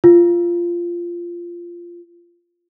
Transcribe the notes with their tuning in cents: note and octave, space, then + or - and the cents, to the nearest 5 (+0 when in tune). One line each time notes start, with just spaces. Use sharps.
F4 -10